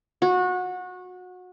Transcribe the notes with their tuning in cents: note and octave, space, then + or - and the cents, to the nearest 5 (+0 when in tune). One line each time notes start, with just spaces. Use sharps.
F#4 -25